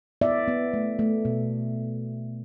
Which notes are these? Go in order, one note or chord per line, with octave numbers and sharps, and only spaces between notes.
B3 D5 E5
B3
A3
A3
B2